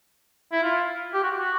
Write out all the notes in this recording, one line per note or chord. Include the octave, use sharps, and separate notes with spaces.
E4
F4
G4
F#4
F#4